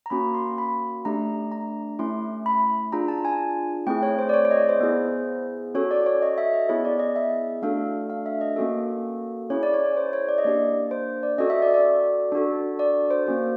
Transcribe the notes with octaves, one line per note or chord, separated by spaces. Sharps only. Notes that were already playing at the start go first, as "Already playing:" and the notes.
A#5
A#3 C#4 F#4 B5
C6
B5
A3 D4 G4 A#5
A#5
A3 C#4 E4 C6
B5
D4 F4 G#4 A#5
A5
G#5
A3 C4 E4 G#4 G5
C#5
C5
D5
C#5
C#5
D#5
D5
C5
B3 E4 G#4
C#4 F#4 A4 C#5
D5
C#5
D#5
E5
D#5
B3 E4 G#4 C#5
D5
D#5
E5
A3 D4 F#4 A4 F5
F5
E5
D#5
A#3 C#4 F#4 A4
C#4 E4 G#4 C#5
D5
C#5
C#5
C5
C#5
D5
D#5
A#3 D4 G4 D5
C5
D5
C#4 F#4 A4 D#5
E5
D5
D5
D4 F#4 A4
D5
C5
A#3 C#4 F#4